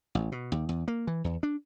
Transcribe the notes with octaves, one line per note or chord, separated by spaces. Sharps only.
A1
B2
D#2
E2
A#3
E3
E2
D4